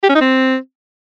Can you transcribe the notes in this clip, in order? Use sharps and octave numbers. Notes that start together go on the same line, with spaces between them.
G4
C#4
D#4
C4